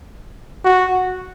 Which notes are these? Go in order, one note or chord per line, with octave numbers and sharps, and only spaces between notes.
F#4